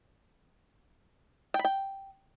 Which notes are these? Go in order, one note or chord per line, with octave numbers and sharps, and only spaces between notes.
G5
B5
G5